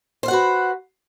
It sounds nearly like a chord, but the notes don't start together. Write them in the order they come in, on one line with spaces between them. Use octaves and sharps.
C5 F5 F#5 F#4 B4